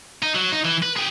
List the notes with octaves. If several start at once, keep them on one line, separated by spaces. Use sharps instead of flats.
D#4
F#3
D#4
E3
B4
G4 G#4